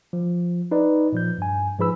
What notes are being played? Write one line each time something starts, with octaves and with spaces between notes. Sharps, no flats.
F3
D#4 B4 D5
A#2 F3 G6
G2 G#5
G#2 F3 G#4 B4 B5 E6